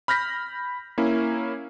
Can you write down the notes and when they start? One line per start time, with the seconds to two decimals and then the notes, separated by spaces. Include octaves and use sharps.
0.08 B5 F6 G6 A#6 B6
0.98 A#3 C#4 E4